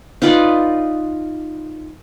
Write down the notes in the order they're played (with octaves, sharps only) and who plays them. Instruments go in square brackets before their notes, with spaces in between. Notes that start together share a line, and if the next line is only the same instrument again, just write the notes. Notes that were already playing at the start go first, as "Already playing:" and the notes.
[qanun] D#4 F4 B4 D5